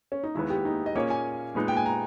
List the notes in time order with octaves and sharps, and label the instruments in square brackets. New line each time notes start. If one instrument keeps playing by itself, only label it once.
[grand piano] C#4
D#4
[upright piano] D#2 D#3 G#3 B3 [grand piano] E4
[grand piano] G4
D#4
D#5
[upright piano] A#2 A#3 C#4 G#4 [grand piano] C#5
[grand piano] G#5
[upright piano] A#2 G#3 B3 D#4
[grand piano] G5
G#5
A#5